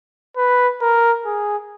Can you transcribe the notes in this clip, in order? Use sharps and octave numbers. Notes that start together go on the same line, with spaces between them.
B4
A#4
G#4